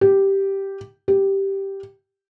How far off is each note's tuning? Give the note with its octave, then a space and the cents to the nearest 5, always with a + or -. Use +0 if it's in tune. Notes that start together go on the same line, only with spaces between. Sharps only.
G4 -5
G4 -5